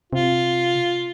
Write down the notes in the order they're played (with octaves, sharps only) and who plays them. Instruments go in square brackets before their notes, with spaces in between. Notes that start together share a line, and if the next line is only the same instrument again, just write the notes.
[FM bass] C3 [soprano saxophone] F4